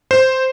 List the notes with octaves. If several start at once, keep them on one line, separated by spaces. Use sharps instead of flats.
C5